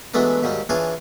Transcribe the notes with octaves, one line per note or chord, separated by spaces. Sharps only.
E3 F#3 G#3 A3 B3 D4
D#2 G#2 F#3 G3
E3 D4 F4 G#4 C#5